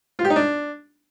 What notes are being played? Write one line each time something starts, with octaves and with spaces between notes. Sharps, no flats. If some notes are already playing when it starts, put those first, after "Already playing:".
F4
G4
D#4
D4